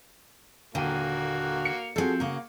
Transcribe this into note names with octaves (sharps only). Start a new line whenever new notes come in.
D#1 D3 A#3 F#4 G5 D#7
C#7
F3 C4 F#4 G#4 A4
C#3 A#3 F#4